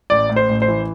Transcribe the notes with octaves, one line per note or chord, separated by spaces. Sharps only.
A1 D5
A2
C5
A1
C5
E3